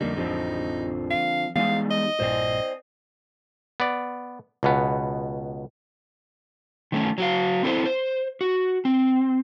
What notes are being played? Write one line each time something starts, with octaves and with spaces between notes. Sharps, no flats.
F2 D3 G3 A#3 D#4
A1 F2 D3 F3 C4
F5
E3 G3 G#3 B3 D#4 F5
D#5
A#1 G2 A#2 C5 D5 G5
B3 D5
C#2 B2 B3
D#3 A3 C#4
F#3 F#4 F5
C4 E4 A4 A#4 C5
C5
F#4
C4